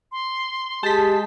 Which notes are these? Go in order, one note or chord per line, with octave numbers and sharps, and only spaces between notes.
C6
G#3 G4 A5 B6